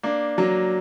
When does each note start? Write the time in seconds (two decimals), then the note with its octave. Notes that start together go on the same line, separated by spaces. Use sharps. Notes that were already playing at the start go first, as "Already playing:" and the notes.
0.03 A#3 D4
0.38 F#3 A#3